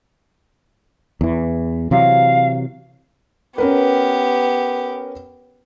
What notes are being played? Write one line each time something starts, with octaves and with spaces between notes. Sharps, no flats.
E2 E3
C3 E3 F#3 F5
B3 C#4 G4 A#4 B4